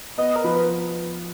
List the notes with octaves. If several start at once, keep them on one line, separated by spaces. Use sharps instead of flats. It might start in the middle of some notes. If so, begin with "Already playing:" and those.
B3 D#5
A#4
F3 B4